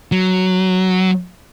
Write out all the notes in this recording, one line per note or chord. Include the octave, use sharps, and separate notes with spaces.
F#3